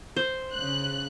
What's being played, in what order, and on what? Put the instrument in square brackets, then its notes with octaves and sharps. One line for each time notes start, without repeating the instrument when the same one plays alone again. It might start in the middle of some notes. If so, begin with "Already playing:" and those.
[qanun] C5
[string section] C#3 F#6